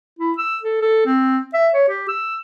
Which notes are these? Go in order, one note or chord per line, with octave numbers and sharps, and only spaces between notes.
E4
E6
A4
A4
C4
E5
C#5
G4
E6